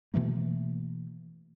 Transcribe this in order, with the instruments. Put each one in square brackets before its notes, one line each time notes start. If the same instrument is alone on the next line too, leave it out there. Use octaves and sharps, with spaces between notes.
[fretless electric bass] B2 E3 A3 A#3